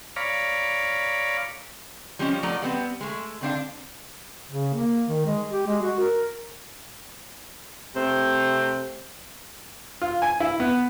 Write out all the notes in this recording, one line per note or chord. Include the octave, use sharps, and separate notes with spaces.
C#5 D5 F5 A#5 B5
F3 G3 G#3 C4 C#4
F3 F#3 A3 D5 A#5
G3 B3 C4
G#3 A3
D3 C4 D4 F5
C#3
A#3
D#3
G#3
G4
G#3
F#4
A#4
C3 A3 C5
F4
G#5
E4
B3